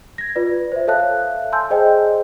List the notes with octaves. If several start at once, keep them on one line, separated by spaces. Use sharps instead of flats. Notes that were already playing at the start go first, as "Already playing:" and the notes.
G#6 A#6
F4 B4 D5
C5 E5
A4 C#5 E5 F5 A5 F#6
G#5 A5 C6 E6 G6
G#4 C5 D5 D#5 G5 A5